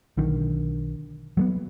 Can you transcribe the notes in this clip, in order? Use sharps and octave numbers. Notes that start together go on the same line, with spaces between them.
B1 D3 D#3
F#3 A3 B3